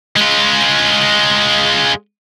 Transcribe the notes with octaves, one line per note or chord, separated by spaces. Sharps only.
G#3 F4